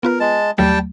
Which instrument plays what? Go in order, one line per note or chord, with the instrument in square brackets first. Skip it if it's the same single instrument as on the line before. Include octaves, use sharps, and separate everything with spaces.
[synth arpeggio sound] B3 F4 B4 [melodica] A#4
[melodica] G#3 A5
[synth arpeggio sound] D#2 F#3 A3 [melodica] G3 G5 A5